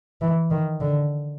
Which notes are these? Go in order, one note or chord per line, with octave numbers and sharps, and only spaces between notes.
E3
D#3
D3